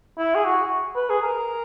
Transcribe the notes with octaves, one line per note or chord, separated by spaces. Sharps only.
E4
G#4
F#4
B4
G#4
A#4